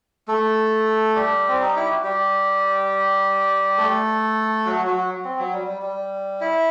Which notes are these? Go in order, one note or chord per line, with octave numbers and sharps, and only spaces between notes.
A3 A4
G3 G4
C4
D#4
E4
F#4
G3 G4
A3 A4
F#3 F#4
F#3 F#4
C4
F#3
G3
G3
G3
E4